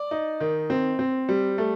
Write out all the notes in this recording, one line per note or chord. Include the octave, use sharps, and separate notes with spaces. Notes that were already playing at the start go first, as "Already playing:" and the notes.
Already playing: D5
D#4
D#3
C4
C4
G3
A3